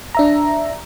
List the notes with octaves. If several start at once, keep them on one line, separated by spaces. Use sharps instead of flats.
D4 E5 A#5